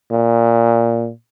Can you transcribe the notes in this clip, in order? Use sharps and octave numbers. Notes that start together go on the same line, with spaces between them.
A#2